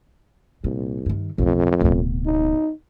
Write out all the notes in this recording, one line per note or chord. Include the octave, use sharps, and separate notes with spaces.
C2 A#2
G2 D#3
B1 F2 A2
D1 B2
D#4